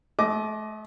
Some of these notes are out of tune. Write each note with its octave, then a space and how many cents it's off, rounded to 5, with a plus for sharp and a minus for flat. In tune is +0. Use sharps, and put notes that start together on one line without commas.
A3 -35 D#5 +15 D6 +0